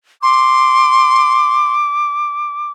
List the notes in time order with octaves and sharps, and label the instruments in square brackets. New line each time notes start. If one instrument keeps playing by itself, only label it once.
[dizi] C6 [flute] D6